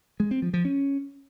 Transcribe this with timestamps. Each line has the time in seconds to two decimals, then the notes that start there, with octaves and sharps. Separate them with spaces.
0.20 G#3
0.31 C4
0.42 F3
0.54 F3
0.65 C#4